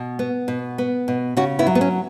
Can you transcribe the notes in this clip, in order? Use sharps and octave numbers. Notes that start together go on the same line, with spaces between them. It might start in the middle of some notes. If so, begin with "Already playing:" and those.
Already playing: B2
B3
B2
B3
B2
C#3 C#4 F#4
B3 E4
F#3
B3
C#4